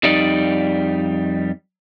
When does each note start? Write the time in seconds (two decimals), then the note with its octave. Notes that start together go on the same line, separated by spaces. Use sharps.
0.03 F2 G3 D#4 D5